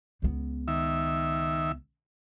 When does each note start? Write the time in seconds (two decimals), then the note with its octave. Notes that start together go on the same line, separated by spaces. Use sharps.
0.22 C#2 B3
0.68 D#3 E5